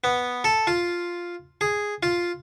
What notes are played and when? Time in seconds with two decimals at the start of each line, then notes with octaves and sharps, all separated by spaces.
0.04 B3
0.44 A4
0.67 F4
1.61 G#4
2.03 F4